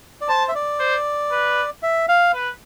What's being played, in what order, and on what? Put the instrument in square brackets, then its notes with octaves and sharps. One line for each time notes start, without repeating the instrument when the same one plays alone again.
[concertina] D5
[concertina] C5 [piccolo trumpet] A5
[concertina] E5
D5
[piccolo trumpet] C5
B4
[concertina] E5
F5
[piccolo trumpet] B4